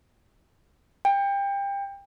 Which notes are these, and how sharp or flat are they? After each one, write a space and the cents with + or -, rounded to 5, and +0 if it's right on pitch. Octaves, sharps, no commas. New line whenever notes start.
G5 +25